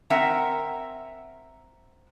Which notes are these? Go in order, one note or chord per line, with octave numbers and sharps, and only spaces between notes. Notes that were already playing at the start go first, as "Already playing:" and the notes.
C4 A#4 E5 F#5 A#5